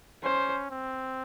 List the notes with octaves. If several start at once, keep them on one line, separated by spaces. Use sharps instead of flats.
C#4 C5
C4